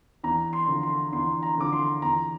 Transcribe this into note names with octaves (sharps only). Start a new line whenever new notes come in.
E2 A#5
C6
D3 F3
C6
E2 C6
A#5
D3 F3 D6
C6
E2 A#5